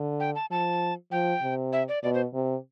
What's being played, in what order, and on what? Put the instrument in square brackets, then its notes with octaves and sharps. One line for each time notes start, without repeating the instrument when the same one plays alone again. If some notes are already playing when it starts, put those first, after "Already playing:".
Already playing: [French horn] D3
[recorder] G5
A5
[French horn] F3 [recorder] A5
[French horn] F3 [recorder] G5
[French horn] C3
[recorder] E5
D5
[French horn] B2 [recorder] D5
[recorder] C5
[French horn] C3